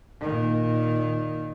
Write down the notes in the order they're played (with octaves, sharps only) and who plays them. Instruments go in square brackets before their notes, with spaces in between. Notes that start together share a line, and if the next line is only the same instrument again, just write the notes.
[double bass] A#2 D#3